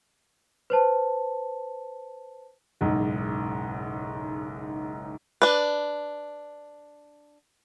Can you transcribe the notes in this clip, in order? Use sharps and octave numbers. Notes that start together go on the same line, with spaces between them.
B4 C5 A5
F#1 B1 G#2
D4 B4